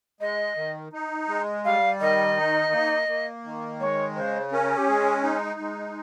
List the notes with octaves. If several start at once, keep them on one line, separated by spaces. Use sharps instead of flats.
G#3 D#5
D#3
D#4
G#3
G3 F5
D#3 D#5
D#4
A#3
A#3
D#3
G#3 C#5
C#3 C5
C#4 A#4
G4
G#3 G#4
D#4
G#3